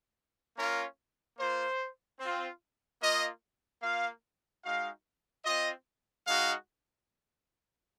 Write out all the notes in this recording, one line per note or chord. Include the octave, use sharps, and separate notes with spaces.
A#3 C#4 F4 A#4
A#3 F4 C5
C4 F4
A#3 F4 D#5
A#3 F4 F5
G#3 D#4 F#4 F5
C4 F4 D#5
G#3 D#4 F#4 F5